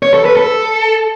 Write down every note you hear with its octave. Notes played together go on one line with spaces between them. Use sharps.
C#5
A4
B4
A4